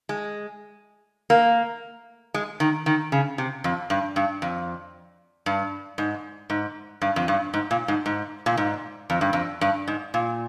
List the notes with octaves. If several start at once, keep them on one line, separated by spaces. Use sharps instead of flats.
G#3
A#3
G#3
D#3
D#3
C#3
C3
F2
G2
G2
F2
G2
G#2
G#2
G2
F2
G2
G#2
A#2
G#2
G#2
A#2
G#2
F2
G2
F2
G2
G#2
A#2